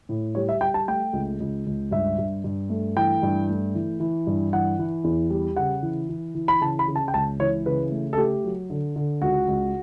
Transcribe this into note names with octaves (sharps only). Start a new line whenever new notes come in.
A2
G3 C#5
E5
G3 G5
A5
A3 G5
C#2
C#2
C#2
G2 E5
G2
G2
A3
E3 G5
G2
A3
E3
E3
G2
E3 F#5
E3
E2
G3
C#3 F#5
E3
E3
E3
B5
C#3 A5
B5
C#3
A5
G5
C#2 A5
E3 C#5
C#3 B4
A3
A4
A3 G4
F#3
D3
D3
C#2 F#4
C#2